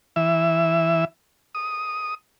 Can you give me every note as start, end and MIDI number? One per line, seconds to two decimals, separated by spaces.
0.16 1.05 52
0.16 1.05 76
1.55 2.14 87